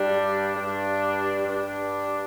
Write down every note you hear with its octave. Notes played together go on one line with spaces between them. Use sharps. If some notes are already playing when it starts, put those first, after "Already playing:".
Already playing: G2 G3 D4
G2 G3 D4
G2 G3 D4